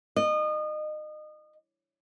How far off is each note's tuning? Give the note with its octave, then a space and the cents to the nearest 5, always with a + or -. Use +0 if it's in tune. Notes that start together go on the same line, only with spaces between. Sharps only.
D#5 -30